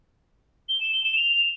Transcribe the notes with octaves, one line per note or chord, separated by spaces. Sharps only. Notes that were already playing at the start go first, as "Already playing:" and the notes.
G7
E7
G7
E7
F7